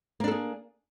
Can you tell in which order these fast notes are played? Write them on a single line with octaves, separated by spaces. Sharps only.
A#3 D4 A4 G#4